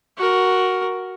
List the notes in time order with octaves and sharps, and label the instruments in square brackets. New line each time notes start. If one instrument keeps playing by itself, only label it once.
[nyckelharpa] F#4 A#4